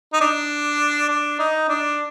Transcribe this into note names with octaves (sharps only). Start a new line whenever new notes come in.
D#4
D4
D4
D#4
D4